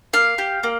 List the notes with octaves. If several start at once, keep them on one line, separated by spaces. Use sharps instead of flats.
A#3 F5
G4
A#3